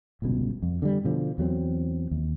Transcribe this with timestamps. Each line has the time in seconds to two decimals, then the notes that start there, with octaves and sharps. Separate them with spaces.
0.22 D1 G1 C#2 B2
0.62 F2
0.82 D3 F#3 G3
1.04 B2 D3 F3
1.38 E2 F#3 A3 C4
2.11 D#2